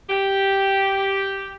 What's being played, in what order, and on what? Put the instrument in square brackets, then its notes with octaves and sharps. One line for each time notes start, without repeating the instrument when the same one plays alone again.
[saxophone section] G4